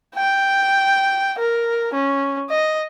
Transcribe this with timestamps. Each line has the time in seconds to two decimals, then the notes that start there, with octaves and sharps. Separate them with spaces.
0.15 G5
1.39 A#4
1.93 C#4
2.50 D#5